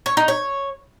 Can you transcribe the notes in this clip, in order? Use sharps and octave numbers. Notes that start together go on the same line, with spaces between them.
C#5
D#4
C#5